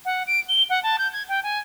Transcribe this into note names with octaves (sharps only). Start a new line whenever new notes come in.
F#5
D7
G7
F#5
A5
G6
G#6
G5
G#5